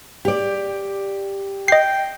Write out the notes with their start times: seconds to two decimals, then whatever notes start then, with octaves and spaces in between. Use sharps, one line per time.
0.25 G4 D5
1.68 D#5 G5 C7